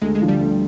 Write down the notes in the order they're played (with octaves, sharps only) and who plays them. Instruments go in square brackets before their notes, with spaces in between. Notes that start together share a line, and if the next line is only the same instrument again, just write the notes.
[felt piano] D2 [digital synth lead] G#3
[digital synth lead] G#3
[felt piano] D3 F3
[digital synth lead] G3
[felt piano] D2